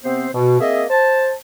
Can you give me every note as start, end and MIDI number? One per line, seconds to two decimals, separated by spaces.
0.03 0.27 48
0.03 0.27 59
0.03 0.27 60
0.03 0.27 72
0.33 0.57 47
0.60 0.84 58
0.60 0.84 60
0.60 0.84 68
0.60 0.84 75
0.60 0.84 76
0.90 1.33 72
0.90 1.33 81